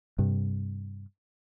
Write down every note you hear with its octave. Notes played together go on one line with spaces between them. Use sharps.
G2 C3